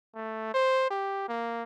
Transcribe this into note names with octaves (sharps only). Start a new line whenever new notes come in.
A3
C5
G4
A#3